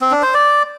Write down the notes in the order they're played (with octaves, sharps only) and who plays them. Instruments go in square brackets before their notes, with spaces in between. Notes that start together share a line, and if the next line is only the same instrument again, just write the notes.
[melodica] C4
D4
C5
D5